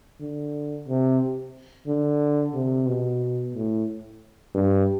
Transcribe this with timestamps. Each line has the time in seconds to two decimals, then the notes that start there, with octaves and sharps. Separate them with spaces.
0.20 D3
0.88 C3
1.87 D3
2.54 C3
2.87 B2
3.54 A2
4.54 G2